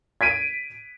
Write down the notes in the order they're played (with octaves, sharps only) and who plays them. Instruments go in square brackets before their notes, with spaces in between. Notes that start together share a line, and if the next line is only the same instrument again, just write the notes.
[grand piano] G#6 B6 D7 D#7